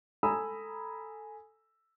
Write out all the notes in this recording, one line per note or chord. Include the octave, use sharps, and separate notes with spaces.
A4 G#5 A#5 B5 D#6 E6